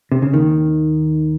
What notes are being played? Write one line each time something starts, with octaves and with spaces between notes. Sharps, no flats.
C3
C#3
D#2 D#3